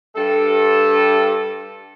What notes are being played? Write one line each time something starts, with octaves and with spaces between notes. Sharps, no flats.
G2 A4